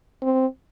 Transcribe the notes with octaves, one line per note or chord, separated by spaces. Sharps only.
C4